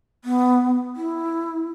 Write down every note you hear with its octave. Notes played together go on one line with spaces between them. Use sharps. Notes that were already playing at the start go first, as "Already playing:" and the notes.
B3
E4